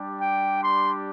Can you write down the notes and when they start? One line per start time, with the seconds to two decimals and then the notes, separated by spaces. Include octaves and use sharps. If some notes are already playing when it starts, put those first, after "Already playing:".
Already playing: G3 D4 G4
0.20 G5
0.63 C6